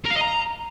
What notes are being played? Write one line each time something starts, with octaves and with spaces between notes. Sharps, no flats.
A#4
F5
D#5
A#5